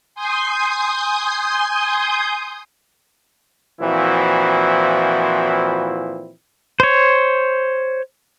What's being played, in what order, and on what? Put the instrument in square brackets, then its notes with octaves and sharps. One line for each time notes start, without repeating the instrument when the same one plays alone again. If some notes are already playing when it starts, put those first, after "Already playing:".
[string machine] G#5 C6 D#6 G6
[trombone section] A#2 E3 F3 C4 E4 F#4
[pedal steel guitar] C5 C#5